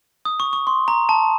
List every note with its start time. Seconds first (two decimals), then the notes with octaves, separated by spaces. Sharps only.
0.25 D#6
0.40 C#6
0.53 C#6
0.67 C6
0.88 A#5
1.09 A5